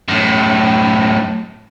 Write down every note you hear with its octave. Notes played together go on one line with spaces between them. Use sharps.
F#2 A2